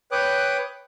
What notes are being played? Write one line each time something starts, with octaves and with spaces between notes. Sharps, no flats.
B4 C#5 G5 D6 D#6 F#6